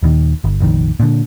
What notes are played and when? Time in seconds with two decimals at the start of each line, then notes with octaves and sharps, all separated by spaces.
0.03 D#1 D#2 D#3
0.44 G1
0.60 F1 A#1 D#3
1.00 A#2 D3